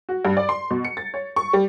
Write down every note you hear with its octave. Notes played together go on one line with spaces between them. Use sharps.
F#4
G2
D5
C6
B2
C#7
A6
C#5
C#6
G3